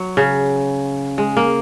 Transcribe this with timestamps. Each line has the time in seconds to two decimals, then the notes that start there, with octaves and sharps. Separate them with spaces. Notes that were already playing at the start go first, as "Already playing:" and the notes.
Already playing: F#3
0.17 C#3
1.18 G#3
1.37 A#3